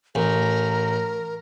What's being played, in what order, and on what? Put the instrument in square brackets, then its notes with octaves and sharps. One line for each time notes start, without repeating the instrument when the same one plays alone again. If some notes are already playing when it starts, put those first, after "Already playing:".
[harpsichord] A1 [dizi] A#4